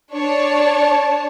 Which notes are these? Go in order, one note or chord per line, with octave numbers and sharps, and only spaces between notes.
D4 C#5 A5